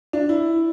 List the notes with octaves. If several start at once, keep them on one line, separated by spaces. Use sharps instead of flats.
D4
E4